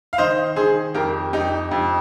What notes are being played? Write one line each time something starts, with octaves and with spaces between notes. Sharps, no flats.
F5
D#3 C5 D#5
D#3 G#4 C5
F2 G4 A#4
F2 D#4 G4
F2